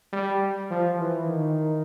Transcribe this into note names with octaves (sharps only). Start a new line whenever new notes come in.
G3
F3
E3
D#3